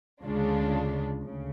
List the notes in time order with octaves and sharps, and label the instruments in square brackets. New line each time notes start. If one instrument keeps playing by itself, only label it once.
[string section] D2 C#3 G#3 D4 F4
D2 C#3